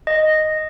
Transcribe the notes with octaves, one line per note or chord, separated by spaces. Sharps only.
D#5